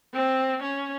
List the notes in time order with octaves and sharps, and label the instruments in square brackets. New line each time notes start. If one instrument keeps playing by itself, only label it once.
[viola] C4
C#4